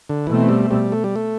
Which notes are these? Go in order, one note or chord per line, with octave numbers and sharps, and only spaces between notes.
D3
B2 E3 A3 C4
G3
G3
A3
G3
A3